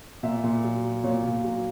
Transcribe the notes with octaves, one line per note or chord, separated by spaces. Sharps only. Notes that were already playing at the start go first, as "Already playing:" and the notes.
A#2 E5
A#2
F#3
F#3
A#2 C#5
A#2
F#3